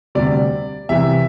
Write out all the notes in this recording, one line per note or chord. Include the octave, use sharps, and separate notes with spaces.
D2 C3 G3 D5
C2 C3 E3 E5